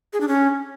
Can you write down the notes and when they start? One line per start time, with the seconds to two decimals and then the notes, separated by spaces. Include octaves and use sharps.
0.13 G#4
0.21 D4
0.28 C#4